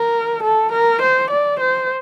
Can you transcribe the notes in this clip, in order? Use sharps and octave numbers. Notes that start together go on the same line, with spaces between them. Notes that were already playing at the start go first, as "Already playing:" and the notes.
Already playing: A#4
A4
A#4
C5
D5
C5